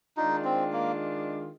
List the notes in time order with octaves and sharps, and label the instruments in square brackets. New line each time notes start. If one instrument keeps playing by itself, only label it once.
[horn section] D#3 G#3 D4 F4 [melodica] D#4
[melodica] C4
A#3